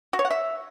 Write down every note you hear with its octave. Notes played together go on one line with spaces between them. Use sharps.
F#4
C#5
F#5
E5